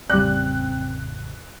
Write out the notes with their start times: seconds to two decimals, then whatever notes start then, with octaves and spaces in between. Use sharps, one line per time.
0.10 A1 F2 C#3 G3 C4 D5 F#6